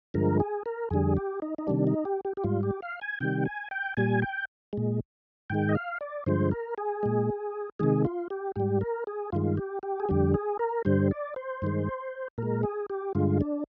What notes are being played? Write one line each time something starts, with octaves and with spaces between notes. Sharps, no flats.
G2 D3 F3 G#3 A#4
G#4
A#4
F2 D3 G3 G#4
G4
D#4
D#4
C3 D#3 G3 D4
D#4
G4
G4
G4
G#2 G3 F4
G4
F5
G#5
C3 D#3 G3 G5
G#5
G5
A#2 G3 G#5
G5
A#2 G#3
G#2 D#3 G#3 G5
D#5
F5
D5
G2 D3 F3 G#3 C5
A#4
G#4
A#2 G#3
C3 D#3 G#3 G#4
F4
G4
G#2 G3 G4
A#4
G#4
G2 D#3 G#3 F4
G4
G4
G#4
F2 D3 G3 G4
G#4
A#4
G2 D3 G3 C5
D5
C5
G2 D#3 G#3
A#2 G#3 A#4
G#4
G4
G2 D3 G#3 F4
D4